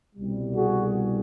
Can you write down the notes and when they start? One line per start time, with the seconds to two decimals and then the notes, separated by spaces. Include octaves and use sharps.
0.16 C2 B2 G3
0.56 F#4 G#4